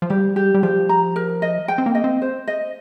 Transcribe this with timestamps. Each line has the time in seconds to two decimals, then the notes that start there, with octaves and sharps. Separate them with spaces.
0.02 F3
0.10 G3 G4
0.36 G4
0.54 G3
0.63 F3 G4
0.89 A#5
1.16 A#4
1.42 D#5
1.68 G5
1.78 C4
1.86 A#3
1.95 D#5
2.04 C4
2.22 C5
2.47 D#5